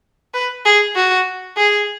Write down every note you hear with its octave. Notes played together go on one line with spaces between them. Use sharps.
B4
G#4
F#4
G#4